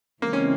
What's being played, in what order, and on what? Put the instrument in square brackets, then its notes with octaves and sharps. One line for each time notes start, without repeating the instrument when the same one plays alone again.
[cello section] C#3 E3 G#3 C4 [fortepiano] A#3
[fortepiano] C#4